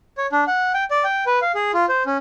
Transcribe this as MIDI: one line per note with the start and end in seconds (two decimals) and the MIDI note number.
0.18 0.27 73
0.32 0.44 62
0.47 0.72 78
0.74 0.84 79
0.91 1.04 74
1.04 1.24 79
1.26 1.39 71
1.42 1.52 77
1.55 1.71 68
1.74 1.86 65
1.89 2.03 72
2.06 2.17 61